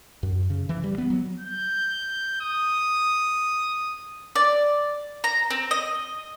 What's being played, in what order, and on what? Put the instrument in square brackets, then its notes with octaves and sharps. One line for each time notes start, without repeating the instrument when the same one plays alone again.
[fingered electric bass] F#2
C#3
E3
G3
B3
F#3
[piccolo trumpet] G6
D#6
[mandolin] D5
A#5
C4
D#5